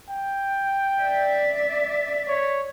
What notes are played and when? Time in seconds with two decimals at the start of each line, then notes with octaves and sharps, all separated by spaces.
0.10 G5
1.02 D5 E5
2.28 C#5